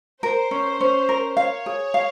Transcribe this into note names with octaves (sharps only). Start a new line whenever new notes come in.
A#4 C5
C#4
C#4
A#4
C#5 F5
G#4
F5